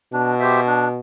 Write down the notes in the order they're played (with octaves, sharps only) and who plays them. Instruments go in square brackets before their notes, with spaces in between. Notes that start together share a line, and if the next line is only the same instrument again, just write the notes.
[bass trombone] B2 [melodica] D4
[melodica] G4 C5 E5
D4